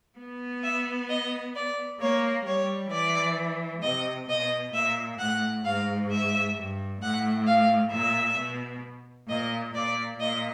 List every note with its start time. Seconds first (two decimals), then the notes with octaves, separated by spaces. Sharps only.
0.18 B3
0.63 E5
1.09 D#5
1.55 D5
2.00 A#3 C#5
2.45 G3 C#5
2.91 E3 D5
3.82 C3 D#5
4.28 B2 D#5
4.73 A#2 E5
5.18 A2 F#5
5.64 G#2 F5
6.09 E5
6.56 G2
7.01 A2 F#5
7.46 F5
7.92 A#2 E5
8.37 B2
9.28 A#2 D#5
9.74 A#2 D5
10.19 A#2 D#5